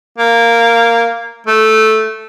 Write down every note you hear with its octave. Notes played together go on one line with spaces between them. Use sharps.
A#3
A3